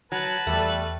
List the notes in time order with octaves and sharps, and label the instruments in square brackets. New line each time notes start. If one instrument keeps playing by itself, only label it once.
[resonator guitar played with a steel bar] F#3 [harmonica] B4 A5
[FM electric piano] E2 [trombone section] G3 A4 [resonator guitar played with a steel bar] A3